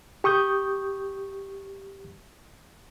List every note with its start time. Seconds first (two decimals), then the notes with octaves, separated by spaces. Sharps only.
0.24 G4 C#6 D#6 G6